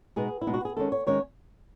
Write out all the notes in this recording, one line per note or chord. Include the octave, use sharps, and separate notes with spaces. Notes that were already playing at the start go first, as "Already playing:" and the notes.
B2 G#3 B3 D#4 G#4
E4
B2 G#3 B3 D#4
F#4
G#4
D#3 G#3 C#4 A4
C#5
D#3 G#3 C#4 C#5